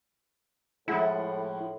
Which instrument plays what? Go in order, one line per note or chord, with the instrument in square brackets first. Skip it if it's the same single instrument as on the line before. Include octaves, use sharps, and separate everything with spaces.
[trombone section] A2 [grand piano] F3 G#3 F#5 [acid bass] E4